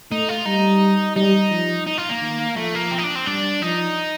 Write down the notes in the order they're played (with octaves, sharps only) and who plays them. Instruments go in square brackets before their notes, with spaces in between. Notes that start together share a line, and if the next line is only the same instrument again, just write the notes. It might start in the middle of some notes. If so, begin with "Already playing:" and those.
[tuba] A3 [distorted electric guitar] D#4
[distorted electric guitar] F4
[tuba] G3 [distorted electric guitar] D#4
[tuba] G3 [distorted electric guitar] D#4
[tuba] F3
[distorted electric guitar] D#4
F4
A#3
[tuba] D#3
[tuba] F3 [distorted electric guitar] A3
[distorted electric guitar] A#3
C4
D#4
D4
C4
[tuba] G3 [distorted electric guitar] D4
[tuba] F3 [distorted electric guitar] D#4